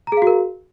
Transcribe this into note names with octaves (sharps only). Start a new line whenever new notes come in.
F#4 G#4 A#4 F5 A#5